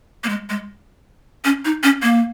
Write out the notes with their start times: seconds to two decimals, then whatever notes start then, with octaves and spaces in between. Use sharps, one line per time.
0.24 A#3
0.29 G#3
0.50 G#3
1.45 C#4
1.65 D#4
1.83 C#4
2.03 A#3